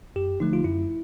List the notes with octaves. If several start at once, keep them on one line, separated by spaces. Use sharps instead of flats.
F#2 G4
D3 F3 A3 D#4
F4
F#2 E4